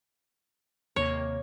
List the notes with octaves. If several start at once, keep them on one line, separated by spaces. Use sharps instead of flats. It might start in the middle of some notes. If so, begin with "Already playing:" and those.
D#2 C3 A#3 C#5